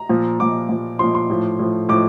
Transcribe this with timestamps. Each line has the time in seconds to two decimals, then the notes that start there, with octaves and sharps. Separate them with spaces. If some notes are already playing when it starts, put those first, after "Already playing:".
Already playing: A#5
0.09 A#2 F3
0.39 A#2 F3 D6
0.69 A#2 F3
0.99 A#2 F3 C6
1.15 C6
1.30 A2 F3
1.59 A2 F3
1.89 A2 F3 D6